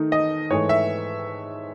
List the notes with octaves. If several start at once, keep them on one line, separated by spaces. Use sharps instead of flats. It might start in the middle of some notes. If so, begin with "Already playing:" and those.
Already playing: D#3 A3 D#4
D#5
G#2 E3 A3 C#5
E5